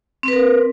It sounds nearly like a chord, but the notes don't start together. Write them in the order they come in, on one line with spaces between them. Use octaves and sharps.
C4 B4 A#4